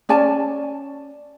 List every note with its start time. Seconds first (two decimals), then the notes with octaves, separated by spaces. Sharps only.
0.09 C#4 D5 G#5 A5